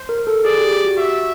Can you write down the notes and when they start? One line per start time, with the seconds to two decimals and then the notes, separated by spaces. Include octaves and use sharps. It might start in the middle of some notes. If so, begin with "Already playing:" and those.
Already playing: C5
0.09 A#4
0.27 A4
0.45 G#4 D5
0.58 G4
0.71 G4
0.85 F#4
0.97 F#4 E5